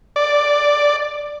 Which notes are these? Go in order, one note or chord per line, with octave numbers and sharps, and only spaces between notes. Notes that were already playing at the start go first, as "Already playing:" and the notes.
D5